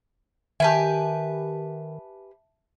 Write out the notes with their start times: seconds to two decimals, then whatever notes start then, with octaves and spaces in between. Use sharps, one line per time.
0.60 D#3 G4 B4 E5 G#5 A5